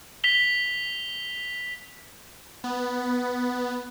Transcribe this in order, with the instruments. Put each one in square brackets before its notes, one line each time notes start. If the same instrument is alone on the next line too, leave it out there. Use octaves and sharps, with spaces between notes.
[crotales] B6 F7 G7
[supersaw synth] B3